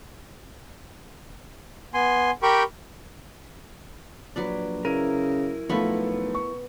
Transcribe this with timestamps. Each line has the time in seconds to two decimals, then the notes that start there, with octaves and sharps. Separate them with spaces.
1.94 B3 G#5 C6
2.43 G4 A#4 G5 B5 C#6
4.36 A#1 F#3 B4 D5
4.85 C#3 E4 A#4 D#7
5.69 B1 F3 A3 B3 F4 B5 C#6
6.35 C#6